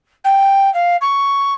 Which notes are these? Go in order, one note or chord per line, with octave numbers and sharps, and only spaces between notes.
G5
F5
C#6